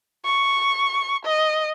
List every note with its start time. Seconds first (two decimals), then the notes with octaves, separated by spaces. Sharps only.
0.25 C#6
1.26 D#5